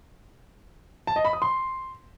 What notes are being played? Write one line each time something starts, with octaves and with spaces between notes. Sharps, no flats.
A5
D#5
B5
D#6
C6